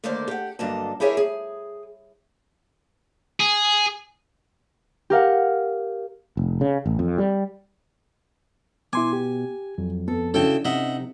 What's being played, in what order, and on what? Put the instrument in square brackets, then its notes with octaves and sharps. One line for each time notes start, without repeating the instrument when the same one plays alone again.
[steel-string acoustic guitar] D3 D#3 A3 A#3 C5 D5
G4 F#5
G2 D3 F#3 A#3 D#5 A5
E4 G4 G#4 A#4 C#5 E5
G#4
[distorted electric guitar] G#4
[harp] G4 A#4 F5 F#5
[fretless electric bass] F1
C#3
A1
F2
G3
[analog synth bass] B2 [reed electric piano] E4 C6 D6 [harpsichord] G#5
[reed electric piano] G4
[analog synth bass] F2 [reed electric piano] F#3
[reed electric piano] B3 [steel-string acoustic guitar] A4
[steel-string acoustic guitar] C#3 E4 F#4 [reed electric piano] C#4 D4 [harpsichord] A4 G5 A5
[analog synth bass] C3 [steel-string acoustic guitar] D#4 [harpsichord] D#5 E5 F#5